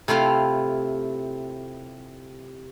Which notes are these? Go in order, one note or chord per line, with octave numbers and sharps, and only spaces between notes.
C3 A3 E4 F4 F5